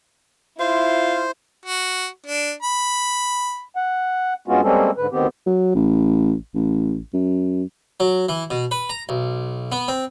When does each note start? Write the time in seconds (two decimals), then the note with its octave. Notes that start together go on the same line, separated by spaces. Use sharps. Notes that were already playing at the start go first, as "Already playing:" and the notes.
0.60 E4 F4 C5
1.66 F#4
2.27 D4
2.63 B5
3.76 F#5
4.48 G2 G#3 B3 C#4 F4 F#4
4.63 G3 G#3 A#3 C4 C#4 A4
4.97 G#2 D3 B4
5.12 D2 D#3 B3 C4 G4
5.47 F#3
5.75 A1
6.55 A1
7.14 F#2
8.00 F#3
8.29 E3
8.51 B2
8.71 B4
8.90 A#5
9.09 B1
9.72 B3
9.88 C4